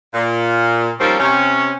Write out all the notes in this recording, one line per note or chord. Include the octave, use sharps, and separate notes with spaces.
A#2
D#3 F3 G3 A#3 C4 C#4
C3 C#4